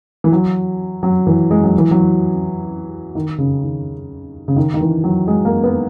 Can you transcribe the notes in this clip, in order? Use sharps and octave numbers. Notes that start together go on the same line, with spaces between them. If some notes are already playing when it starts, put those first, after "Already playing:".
E3
F#3
F#3
E3
G#3
F#3
E3
F#3
D#3
C#3
D#3
C#3
D#3
D#3
E3
F#3
G#3
A#3
B3